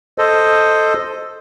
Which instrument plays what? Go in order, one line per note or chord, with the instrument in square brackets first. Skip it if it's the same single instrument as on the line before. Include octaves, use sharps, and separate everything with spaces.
[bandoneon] A4 C5 D#5